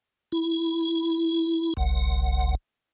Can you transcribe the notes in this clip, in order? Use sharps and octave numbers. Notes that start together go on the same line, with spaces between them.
E4
F#1 C2 F#5